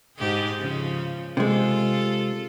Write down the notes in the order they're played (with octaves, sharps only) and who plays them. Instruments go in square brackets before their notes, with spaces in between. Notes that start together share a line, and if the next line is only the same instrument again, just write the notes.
[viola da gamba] G#2 G4 G#4
C#3 F3
[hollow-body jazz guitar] C3 G#3 [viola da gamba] F4 A4